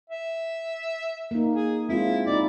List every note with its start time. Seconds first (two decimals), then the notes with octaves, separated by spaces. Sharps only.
0.10 E5
1.31 A#3 D#4
1.51 G#4
1.89 G#3 C4 E4 F4
2.26 D#4 E4 D5